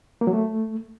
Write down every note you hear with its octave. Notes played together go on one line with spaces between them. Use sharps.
A#3
F#3
A3